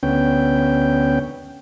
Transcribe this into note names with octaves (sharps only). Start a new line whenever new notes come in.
D2 B3 C#4 G5